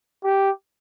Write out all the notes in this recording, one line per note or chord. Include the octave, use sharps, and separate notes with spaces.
G4